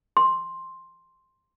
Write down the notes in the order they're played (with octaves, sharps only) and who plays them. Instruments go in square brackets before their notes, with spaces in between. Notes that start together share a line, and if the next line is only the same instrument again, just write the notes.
[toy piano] C6